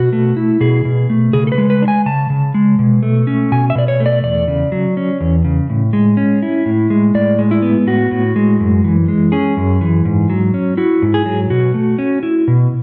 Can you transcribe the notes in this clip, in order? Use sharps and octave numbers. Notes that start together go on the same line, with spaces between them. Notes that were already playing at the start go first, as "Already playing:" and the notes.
Already playing: B2 F#4
A3
E4
B2 G#4
B2
A3
C#3 G#4
A4
B4
G#3
B4
D4
G#5
C#3 A5
C#3
G#3
B2
A3
C#4
B2 G#5
E5
B2 D5
C#5
A3
D5
E2 D5
C#3
F#3
C#4
E2
C#3
A2
G#3
C#4
E4
A2
G#3
A2 D5
G#3
E4
B3
A2 F#4
A2
G#3
F#2
E3
G#3
C#4 G#4
F#2
E3
G#2
F#3
C#4
E4 F#4
G#2
G#4
F#3
B2 F#4
A3
C#4
E4
B2